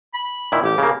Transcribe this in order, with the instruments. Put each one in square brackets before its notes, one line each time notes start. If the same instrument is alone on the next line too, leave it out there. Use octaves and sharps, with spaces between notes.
[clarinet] B5
[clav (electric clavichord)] A#2 D#3 E4
[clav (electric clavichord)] A1 [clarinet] G4
[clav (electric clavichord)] C#3 A#3